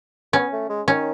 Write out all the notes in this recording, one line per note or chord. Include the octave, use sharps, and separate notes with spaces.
B3 C#4
A3
G#3
D#3 C#4